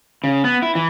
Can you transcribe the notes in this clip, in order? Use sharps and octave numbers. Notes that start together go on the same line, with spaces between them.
C#3
B3
E4
E3